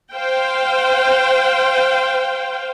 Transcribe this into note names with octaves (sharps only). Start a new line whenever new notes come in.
C5 F5 G5